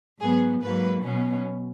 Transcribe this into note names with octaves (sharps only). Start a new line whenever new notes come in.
G#2 F#3 B3 G#4
G#2 F#3 A#3 B4
B2 F#3 C#4